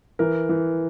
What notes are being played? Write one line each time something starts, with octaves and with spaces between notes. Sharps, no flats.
E3 A#4
E3